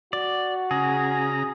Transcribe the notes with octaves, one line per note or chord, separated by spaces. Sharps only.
F#4 D5
C#3 G#4 A#5